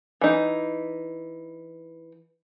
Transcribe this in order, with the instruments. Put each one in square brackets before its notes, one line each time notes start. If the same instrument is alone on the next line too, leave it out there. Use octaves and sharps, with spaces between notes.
[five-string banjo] E3 D#4